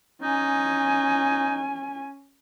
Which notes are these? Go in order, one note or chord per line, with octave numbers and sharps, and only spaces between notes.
C#4 D#4 G#5